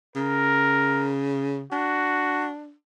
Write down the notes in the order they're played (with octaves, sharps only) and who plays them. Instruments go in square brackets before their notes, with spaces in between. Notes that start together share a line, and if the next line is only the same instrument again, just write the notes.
[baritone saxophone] C#3 [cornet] A#4
[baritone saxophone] D4 [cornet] F#4